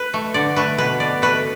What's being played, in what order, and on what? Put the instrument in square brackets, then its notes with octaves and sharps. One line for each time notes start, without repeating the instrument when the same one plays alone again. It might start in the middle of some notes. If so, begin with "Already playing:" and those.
Already playing: [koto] B4
A3
D3 D5
A3 B4
B2 B4
B2 D5
A3 B4